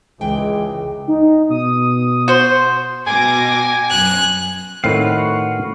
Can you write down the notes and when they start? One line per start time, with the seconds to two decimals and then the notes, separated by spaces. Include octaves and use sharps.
0.21 C#2 E3 G#3 G5
1.08 D#4
1.50 B2 D#6
2.28 F#4 C5 C6
3.07 B2 G#5 D6 A#6
3.91 F#2 F#6
4.84 A2 D#3 C4 F#4 B4 F5